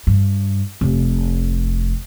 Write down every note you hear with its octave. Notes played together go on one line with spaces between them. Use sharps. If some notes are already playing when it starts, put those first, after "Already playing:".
G2
F1